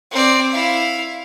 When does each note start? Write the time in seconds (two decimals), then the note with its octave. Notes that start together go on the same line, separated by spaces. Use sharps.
0.11 C4 D5
0.52 E4 F5